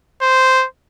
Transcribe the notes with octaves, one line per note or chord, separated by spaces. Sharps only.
C5